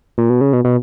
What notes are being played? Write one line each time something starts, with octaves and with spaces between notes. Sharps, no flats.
A#2
B2
C#3
B2
B2